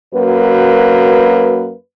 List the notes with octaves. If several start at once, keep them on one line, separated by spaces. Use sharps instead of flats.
F#2 A#3 F#4 B4